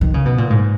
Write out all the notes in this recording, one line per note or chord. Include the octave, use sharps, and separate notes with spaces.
D#3
C#3
B2
A#2
G#2